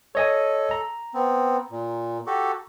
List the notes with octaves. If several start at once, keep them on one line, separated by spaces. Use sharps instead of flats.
A4 C#5 D#5 G#5
A#5
B3 C4
A#2
F#4 G4 A4